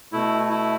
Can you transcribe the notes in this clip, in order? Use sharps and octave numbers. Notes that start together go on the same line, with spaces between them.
B2 A3 E4
E4